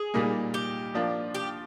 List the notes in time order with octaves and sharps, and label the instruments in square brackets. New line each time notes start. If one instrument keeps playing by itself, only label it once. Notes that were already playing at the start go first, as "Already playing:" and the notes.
Already playing: [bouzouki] G#4
[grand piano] A#2 G3 A#3 D#4
[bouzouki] G4
[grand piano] F3 A#3 D4 F4
[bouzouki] G4